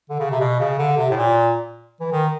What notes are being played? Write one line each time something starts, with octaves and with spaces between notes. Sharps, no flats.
D3
C#3
C3
B2
C#3
D3
C3
A2
A#2
E3
D#3